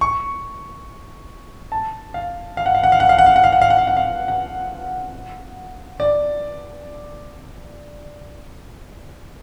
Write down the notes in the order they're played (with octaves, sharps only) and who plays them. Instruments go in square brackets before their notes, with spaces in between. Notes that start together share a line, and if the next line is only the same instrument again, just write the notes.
[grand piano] C#6
A5
F5
F5
F#5
F5
F#5
F5
F#5
F5
F#5
F5
F#5
F5
F#5
F5
F#5
F5
F#5
F5
F#5
D5